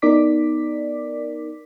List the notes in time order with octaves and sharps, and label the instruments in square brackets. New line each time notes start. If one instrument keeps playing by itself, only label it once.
[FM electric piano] B3 D#4 A#4 D5 D6 B6